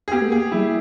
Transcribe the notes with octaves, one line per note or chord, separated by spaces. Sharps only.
G#4
B3 G4
A3
A#3 G#4
F#3 G3 E4